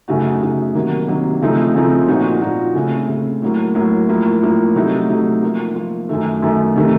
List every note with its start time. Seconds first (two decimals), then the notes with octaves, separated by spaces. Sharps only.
0.08 F#2 C#3 A3 D#4 F#4
0.41 F#2 C#3 A3 D#4 F#4
0.75 C3 D#3 F#3 A#3
1.08 C3 D#3 F#3 A#3
1.42 C#3 F3 A3 C4 D#4
1.74 C#3 F3 A3 C4 D#4
2.08 A#2 F3 A#3 D#4 F#4
2.41 A#2 F3 A#3 D#4 F#4
2.75 C#3 A3 C4
3.09 C#3 A3 C4
3.42 A2 F#3 A#3
3.75 A2 F#3 A#3
4.09 A2 F3 A#3
4.42 A2 F3 A#3
4.75 C3 F#3 A3 D#4
5.09 C3 F#3 A3 D#4
5.43 F3 A#3 F4
5.76 F3 A#3 F4
6.09 F#2 D#3 A3
6.42 F#2 D#3 A3
6.76 C3 D#3 A3